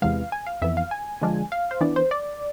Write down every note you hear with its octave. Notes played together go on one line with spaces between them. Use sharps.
E2 C3 E3 G#3 B3 F5
G#5
F5
F2 E3 B3 E5
F5
G#5
D3 F3 G#3 D4 F4
F5
C5
E3 B3 D4 D5
C5
D5